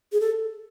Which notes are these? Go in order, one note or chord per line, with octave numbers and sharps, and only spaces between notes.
G#4
A4